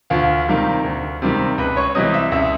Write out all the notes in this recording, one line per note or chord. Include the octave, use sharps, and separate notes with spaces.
D2 F4 F5
C3 D#3 G3 A#3
D2
C3 D#3 G3 A#3
C#2 B4 B5
C#5 C#6
C3 E3 G3 D#5 D#6
E5 E6
C#2 E5 E6